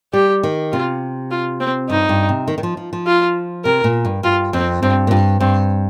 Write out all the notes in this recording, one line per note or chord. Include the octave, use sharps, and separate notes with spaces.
G3 G4
D#3
C3 F4
F4
C4
G2 D#4
G2
C3
D#3
D#3
F3
F3
F3
F4
C3 A#4
A#2
G2
G2 F4
F2 C4
G2 C4
A#2
G2
G2 C4